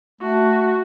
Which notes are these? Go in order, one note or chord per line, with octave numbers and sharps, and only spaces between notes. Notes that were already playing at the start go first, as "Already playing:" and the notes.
A3 F#4